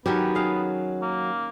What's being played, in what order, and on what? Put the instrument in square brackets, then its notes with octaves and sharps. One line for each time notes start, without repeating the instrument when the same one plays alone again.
[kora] D#3 C#4 G4 [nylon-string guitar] F#3 [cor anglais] B3
[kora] G#4 F5
[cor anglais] A#3